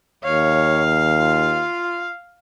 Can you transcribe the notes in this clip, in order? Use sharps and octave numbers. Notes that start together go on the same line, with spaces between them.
D#2 C#5 F5
F4